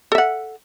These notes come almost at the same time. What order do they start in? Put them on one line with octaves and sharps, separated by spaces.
A4 E5 F#5